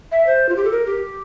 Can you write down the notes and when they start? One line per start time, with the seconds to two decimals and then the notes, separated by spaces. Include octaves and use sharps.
0.12 E5
0.26 C5
0.49 F4
0.56 G4
0.65 A4
0.71 A#4
0.86 G4